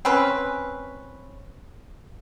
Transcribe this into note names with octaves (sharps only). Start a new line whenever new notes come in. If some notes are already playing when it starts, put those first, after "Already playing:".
C4 C#4 B4